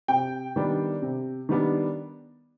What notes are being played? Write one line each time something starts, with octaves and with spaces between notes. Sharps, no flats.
C3 G5
D#3 G3 B3 D4
C3
D#3 G3 B3 D4